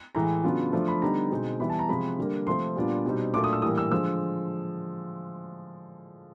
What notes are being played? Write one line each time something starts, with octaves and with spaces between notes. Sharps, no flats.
A2 E3 G#3 A#5
C#3 F#3 B3 D4 F4
F3 A3 D4 F4
B5
D3 G3 B3 D#4 A#5
B2 G#3 C4 D#4
E3 G3 B3 E4 B5
A5
A#5
C3 F3 G#3 B5
D3 G3 A#3
C3 F3 A3 C4 C6
A#2 G3 B3 D4 F4
B2 G3 C4 D#4
A#2 F#3 A3 D4 D6
D#6
E6
A2 E3 G3 A#3 D#6
E6
D3 F3 G#3 E6